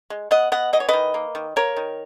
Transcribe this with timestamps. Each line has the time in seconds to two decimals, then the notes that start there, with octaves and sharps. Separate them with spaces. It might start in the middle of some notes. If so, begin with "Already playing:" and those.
0.10 G#3
0.31 B3 D#5 F#5
0.52 B3 D#5 F#5
0.73 E3 D#5
0.80 C#5
0.89 D#3 B4 D#5
1.14 A#3
1.35 D#3
1.56 A#3 A#4 C#5
1.77 D#3